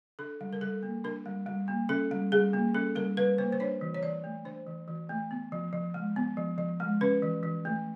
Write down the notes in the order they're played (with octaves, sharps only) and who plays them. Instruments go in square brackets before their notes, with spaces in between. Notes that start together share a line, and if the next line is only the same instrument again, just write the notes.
[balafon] D4 A4
G3
A#4
G3 A4
A#3
D4 A#4
G3
G3
A#3
C#4 A4
G3
G3 G#4
A#3
C#4 A4
G3 A#4
G3 B4
A#3 C5
C5
D4 C#5
E3
C#5
E3 D5
A3
D4 C5
E3
E3
A3
B3
F3
F3
G#3
B3
F3
F3
G#3
C#4 B4
E3
E3
A3